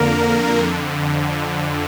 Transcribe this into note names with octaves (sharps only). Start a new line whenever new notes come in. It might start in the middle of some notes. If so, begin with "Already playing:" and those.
Already playing: F2 D3 A#3 A#4
F2 D3